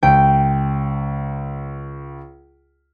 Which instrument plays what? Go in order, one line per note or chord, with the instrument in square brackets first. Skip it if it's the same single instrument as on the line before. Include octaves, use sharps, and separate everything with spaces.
[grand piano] C#2 [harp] G5